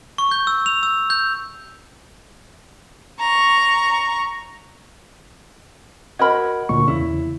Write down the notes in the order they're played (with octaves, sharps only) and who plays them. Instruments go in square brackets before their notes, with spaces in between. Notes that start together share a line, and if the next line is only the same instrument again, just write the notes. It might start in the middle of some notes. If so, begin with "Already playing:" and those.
[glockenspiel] C#6
G6
E6
F7
E6
G6
[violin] A#5 C#6
[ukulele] F#4 A#4 B5 [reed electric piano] D#5 F#5 G#6
[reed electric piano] D2 A#2 C#6
[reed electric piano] E2 C#3 [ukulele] E4